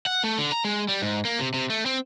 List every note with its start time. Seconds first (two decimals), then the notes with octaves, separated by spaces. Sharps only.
0.06 F#5
0.24 A3
0.38 D3
0.52 A#5
0.65 G#3
0.88 G3
1.02 G#2
1.25 A#3
1.39 C3
1.54 C3
1.70 A3
1.86 C4